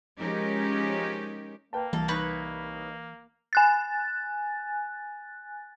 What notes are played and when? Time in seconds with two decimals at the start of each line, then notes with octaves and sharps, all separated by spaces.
0.19 F3 G#3 C#4 D#4 G4 A#4
1.73 A#3 B4 G5 A5
1.93 C2 E3 A4
2.08 D#4 B4 C#5
3.53 G#5 F#6 A6